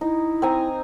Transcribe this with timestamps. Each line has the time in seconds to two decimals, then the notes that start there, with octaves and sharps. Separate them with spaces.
0.01 D#4 E4
0.42 C4 G#5 A#5